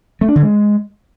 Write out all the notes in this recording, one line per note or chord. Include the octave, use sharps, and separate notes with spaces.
A3
D4
D3
G#3